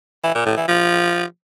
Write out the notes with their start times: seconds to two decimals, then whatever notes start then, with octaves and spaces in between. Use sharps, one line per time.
0.24 E3
0.35 A#2
0.46 A2
0.57 E3
0.68 F3